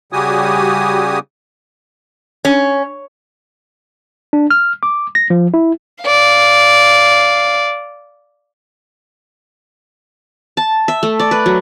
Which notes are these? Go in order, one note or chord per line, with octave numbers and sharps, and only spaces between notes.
C#3 G3 F#4 G4 G#5 D#6
C#4
D4
F6
D6
A#6
F3
E4
D5 F5
A5
E5
A3
D5
B4
F#3